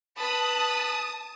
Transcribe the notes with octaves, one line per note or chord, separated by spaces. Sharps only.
B4 A5 B5 D#6